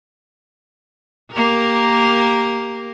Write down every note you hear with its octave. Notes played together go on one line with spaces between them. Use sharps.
A#3 G4 A#4